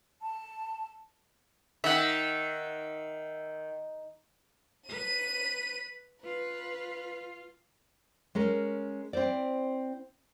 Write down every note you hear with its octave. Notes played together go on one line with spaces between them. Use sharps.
A5
D#3 E5 F#5
B4 D#7
F4 B4
G#3 C#4 A#4
C4 E4 C5 D5